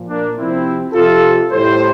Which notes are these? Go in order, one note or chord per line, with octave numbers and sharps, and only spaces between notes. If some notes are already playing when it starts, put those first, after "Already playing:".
Already playing: A#2 F3
A#3 D4
C3 F3 C4 E4
C3 F3 F4 A4
A2 E3 G3 A4 C5